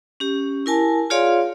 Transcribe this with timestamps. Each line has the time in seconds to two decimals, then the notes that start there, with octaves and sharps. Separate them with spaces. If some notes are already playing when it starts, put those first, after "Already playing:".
0.20 C#4 G4
0.66 E4 A#4 G#5 A5
1.10 F4 G#4 C#5 D5 F5 C6